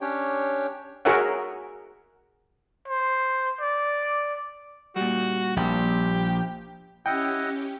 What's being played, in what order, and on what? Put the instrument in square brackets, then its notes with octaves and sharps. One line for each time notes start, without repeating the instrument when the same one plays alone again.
[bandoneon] C#4 D4 G4 C#5 G5
[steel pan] F#4 G#4 A#4 C#5 E5 F#5
[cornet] C5
D5
[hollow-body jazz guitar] A#2 G3 [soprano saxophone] F#4
[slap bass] A#1 [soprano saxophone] G4
[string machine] C#4 G4 [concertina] E4 D#5 F#5 [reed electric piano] G5